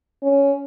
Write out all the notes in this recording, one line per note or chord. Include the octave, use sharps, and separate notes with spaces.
C#4